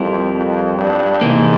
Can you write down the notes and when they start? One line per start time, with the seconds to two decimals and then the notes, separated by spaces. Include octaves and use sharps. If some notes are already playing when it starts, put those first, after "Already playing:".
Already playing: F2 G3 C4 E4 A#4
0.35 F2
0.78 G2
1.21 G#2 C3 E3 A#3